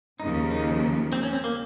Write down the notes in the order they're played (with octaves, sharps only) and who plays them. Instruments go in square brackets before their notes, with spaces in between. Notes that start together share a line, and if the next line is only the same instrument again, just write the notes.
[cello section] D#2 C#3 F3 [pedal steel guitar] D#4
[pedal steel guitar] D#4
C4
C#4
C4
A#3